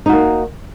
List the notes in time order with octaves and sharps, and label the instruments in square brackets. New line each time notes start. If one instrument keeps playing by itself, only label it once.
[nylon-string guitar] D#4
F#4
A#3